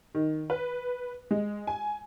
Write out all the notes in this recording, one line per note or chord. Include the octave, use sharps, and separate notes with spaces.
D#3
B4
G#3
G#5